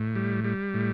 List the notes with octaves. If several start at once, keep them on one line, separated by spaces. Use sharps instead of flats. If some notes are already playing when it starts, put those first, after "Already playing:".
Already playing: A2
G3
G3
A2